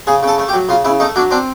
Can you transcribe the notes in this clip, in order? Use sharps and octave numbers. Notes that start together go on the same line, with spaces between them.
C#3 G#4
C#3 A4
A3
G4
F#3
C#3 F4
C#3 E4
A3 D#4
F#3 D4
C4 D4